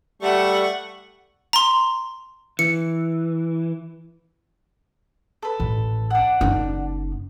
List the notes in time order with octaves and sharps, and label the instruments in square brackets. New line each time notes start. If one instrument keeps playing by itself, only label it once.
[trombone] G3 [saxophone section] A3 [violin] F#5 C#6
[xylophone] A#5 C6
[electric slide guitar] E3 [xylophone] C#7
[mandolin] A4 B4
[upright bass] A1
[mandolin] D4 F#5
[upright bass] F#1 D#4